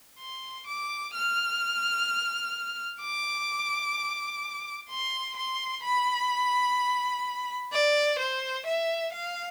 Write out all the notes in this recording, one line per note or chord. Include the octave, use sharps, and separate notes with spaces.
C6
D6
F6
D6
C6
C6
B5
D5
C5
E5
F5